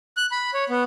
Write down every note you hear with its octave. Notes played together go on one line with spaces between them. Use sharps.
F#6
B5
C#5
B3